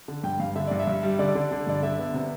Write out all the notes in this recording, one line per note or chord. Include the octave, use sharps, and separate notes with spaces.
D3
G2 G5
G2 F5
D3 E5
G2 D5
E5
G2
G3
D3 D5
D3
D3
G2 D5
D3 E5
B3
C3